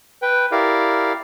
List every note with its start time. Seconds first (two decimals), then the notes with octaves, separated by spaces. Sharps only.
0.22 B4 G5
0.52 E4 G4 A#4 D5 F5